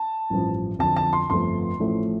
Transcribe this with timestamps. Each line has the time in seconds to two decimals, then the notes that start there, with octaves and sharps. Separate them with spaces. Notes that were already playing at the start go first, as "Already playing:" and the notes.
Already playing: A5
0.30 A1 G2 F3
0.79 F2 D3 F3 A5
0.97 A5
1.13 C6
1.29 G1 F2 F3 A3 C6
1.79 A1 A2 F3 A3